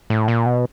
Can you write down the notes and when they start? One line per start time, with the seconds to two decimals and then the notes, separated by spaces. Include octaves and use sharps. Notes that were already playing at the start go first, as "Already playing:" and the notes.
0.10 A2
0.28 A#2
0.46 B2